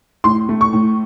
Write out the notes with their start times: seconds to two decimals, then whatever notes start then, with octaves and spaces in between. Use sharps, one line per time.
0.24 A2 C6
0.49 A3
0.61 C#6
0.73 A2